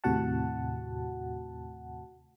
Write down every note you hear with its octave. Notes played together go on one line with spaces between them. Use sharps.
D#2 A2 C3 F#4 F#5 A5